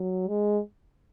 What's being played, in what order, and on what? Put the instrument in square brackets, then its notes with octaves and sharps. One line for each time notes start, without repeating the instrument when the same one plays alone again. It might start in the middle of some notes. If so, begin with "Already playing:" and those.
Already playing: [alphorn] F#3
G#3